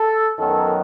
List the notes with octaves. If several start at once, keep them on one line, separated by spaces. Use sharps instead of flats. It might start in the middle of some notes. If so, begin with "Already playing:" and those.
Already playing: A4
F#2 D#3 F#3 B3 A4